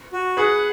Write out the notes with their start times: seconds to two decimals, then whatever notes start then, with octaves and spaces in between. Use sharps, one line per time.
0.13 F#4
0.37 G#4 B4 F#5